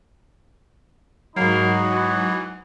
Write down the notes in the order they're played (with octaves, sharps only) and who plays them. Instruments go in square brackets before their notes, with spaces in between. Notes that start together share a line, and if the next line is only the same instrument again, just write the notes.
[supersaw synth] G#2 F#3 [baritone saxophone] A#3 [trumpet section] D#4 F#4 B5
[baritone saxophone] E3